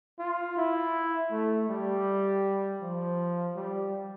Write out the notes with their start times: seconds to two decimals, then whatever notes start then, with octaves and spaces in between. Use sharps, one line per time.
0.19 F4
0.57 E4
1.32 A3
1.69 G3
2.82 F3
3.56 G3